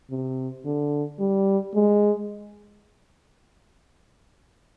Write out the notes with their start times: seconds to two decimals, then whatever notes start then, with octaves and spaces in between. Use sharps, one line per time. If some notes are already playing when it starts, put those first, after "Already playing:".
0.11 C3
0.65 D3
1.20 G3
1.75 G#3